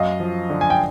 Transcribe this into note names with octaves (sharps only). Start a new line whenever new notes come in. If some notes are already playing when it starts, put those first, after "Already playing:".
Already playing: F#2 D#5 F5
F3
D3
G#5
G5